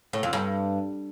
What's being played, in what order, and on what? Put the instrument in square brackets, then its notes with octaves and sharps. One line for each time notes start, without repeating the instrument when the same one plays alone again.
[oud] A2
F2
G2